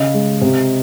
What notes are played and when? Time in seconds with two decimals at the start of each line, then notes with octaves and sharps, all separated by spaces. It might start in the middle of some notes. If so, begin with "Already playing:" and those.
Already playing: C#3 D#5
0.14 G#3
0.41 C3